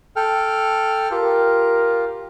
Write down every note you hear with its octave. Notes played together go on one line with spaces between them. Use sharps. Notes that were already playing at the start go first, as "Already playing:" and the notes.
A4 G5 F6
F4 G4 A#4